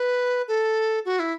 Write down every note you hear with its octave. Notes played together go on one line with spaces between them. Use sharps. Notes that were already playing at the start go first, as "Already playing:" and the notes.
Already playing: B4
A4
F#4
E4